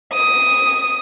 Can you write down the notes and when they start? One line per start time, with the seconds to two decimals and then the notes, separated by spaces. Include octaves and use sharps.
0.12 D#6